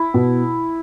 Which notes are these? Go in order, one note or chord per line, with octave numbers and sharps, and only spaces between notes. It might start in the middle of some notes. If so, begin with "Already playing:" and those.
Already playing: E4
B2